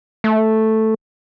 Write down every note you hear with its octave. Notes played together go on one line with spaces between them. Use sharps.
A3